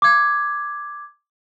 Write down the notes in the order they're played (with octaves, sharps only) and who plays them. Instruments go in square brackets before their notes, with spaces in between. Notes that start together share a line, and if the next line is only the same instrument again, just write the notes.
[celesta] D6 G#6